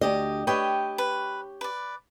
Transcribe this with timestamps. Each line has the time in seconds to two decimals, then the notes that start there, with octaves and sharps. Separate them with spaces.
0.01 D2 G4 D#5
0.47 G4 B4 C#5 D#5 G5
0.98 B4
1.61 B4 D5